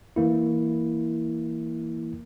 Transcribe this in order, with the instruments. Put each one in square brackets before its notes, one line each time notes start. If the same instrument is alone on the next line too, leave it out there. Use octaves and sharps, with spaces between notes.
[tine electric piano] E3 A#3 E4